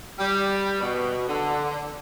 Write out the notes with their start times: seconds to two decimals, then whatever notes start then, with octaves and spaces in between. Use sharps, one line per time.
0.18 G3
0.80 B2
1.27 D3